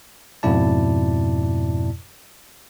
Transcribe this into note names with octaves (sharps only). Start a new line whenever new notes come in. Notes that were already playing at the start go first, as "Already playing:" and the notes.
F2 G#2 B2 E4 D5 A5